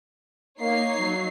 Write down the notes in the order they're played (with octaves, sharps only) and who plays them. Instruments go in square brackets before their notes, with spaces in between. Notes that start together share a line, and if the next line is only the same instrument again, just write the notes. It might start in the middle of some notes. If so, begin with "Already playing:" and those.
[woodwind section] A#3 [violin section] D#4 C#5 C7
[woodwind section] F#3